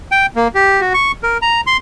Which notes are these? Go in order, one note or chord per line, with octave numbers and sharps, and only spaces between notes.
G5
A#3
G4
F#4
C#6
A#4
A#5
C6